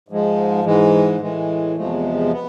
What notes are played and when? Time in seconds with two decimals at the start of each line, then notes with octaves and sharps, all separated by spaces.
0.08 G#2 F3 G#3
0.64 G#2 E3 G#3
1.20 A2 E3 G#3
1.76 E2 C3 F3 G#3 A3
2.32 B3